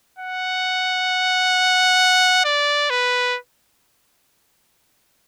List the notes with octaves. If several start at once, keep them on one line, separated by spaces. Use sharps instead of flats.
F#5
D5
B4